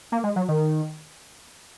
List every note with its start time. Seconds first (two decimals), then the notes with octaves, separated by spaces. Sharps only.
0.12 A#3
0.24 G#3
0.36 F#3
0.48 D#3